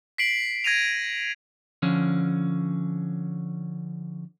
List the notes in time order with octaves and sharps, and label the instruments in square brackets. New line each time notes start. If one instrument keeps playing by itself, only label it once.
[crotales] B6 C7 D7 F#7
G#6 A#6 D#7 F7
[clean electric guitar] D3 F3 C#4